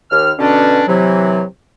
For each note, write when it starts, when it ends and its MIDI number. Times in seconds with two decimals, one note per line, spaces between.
0.11 0.32 39
0.11 0.32 89
0.39 0.82 47
0.39 0.82 50
0.39 0.82 61
0.39 0.82 62
0.88 1.43 48
0.88 1.43 52
0.88 1.43 54